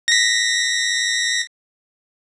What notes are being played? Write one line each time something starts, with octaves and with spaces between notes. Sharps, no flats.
A#6 B6